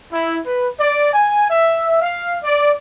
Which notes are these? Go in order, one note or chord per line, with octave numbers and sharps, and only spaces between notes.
E4
B4
D5
G#5
E5
F5
D5